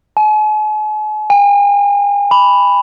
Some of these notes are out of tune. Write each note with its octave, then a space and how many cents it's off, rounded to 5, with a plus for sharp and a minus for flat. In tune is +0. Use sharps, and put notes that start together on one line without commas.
G#5 +45
G#5 -45
B5 +5